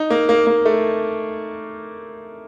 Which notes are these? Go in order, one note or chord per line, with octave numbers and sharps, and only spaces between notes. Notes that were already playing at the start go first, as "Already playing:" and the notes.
Already playing: D#4
A#3
A#3
A#3
A3